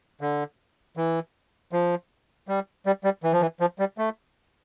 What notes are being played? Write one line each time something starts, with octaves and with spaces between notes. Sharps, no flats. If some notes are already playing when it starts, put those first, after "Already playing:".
D3
E3
F3
G3
G3
G3
E3
F3
E3
F3
G3
A3